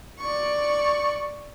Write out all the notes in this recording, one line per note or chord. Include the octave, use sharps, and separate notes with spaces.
D5 C#6